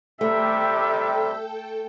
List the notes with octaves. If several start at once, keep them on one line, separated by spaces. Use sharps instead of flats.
C3 G3 A3 G4 A4 E5 G5